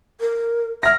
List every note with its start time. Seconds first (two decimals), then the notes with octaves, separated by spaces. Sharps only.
0.20 A#4
0.83 E5 F6 A#6